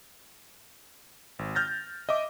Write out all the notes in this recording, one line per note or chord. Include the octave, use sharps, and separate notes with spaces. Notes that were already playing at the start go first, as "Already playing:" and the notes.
G#1
F6 G6 A6 A#6
D#5 E5 D6